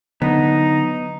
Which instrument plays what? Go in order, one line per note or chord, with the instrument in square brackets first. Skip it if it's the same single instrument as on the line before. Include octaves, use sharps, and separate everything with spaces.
[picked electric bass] D3 F#3 D4 [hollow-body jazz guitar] B3 [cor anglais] D#4